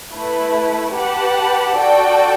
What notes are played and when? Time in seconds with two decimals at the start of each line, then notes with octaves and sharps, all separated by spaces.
0.13 A3 E4 B4
0.96 G4 B4 F#5 A5
1.79 F#4 A4 D5 G5